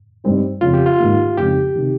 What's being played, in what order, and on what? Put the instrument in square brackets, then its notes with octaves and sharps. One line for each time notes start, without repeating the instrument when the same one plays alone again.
[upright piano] G2 G3 C4 D#4
[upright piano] F2 C#3 F3 [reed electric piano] F4
[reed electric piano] G4
F4
[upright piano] G#2 D#3 A#3 D#4
[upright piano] F2 C#3 G#3 D#4 [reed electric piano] G4
[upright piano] C3 D#3